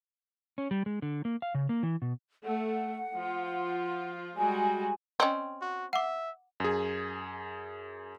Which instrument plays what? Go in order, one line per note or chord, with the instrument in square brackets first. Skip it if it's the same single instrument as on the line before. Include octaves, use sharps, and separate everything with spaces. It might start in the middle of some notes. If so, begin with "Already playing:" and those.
[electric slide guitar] C#4
G3
G#3
D3
A#3
F5
C#3
A#3
E3
B2
[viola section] A3 [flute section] F#5
[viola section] F3 F4
[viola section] G3 G#3 F#4 [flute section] G#5
[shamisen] C4 C#4 [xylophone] D5 D#5 G5
[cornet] F#4
[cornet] E5 [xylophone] F#5 D6
[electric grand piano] F#2 G#4